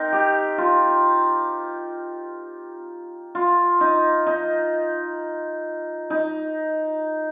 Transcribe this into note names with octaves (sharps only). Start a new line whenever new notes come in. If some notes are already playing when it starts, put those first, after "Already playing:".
Already playing: C4 D#4 A#4
G4
F4
F4
D#4
D#4
D#4